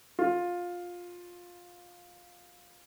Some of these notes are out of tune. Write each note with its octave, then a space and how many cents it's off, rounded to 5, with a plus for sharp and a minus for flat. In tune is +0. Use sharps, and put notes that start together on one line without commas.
F4 +15